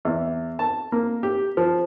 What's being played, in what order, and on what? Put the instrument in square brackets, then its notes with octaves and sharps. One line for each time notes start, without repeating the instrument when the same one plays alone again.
[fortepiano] E2
A5
A#3
G4
F3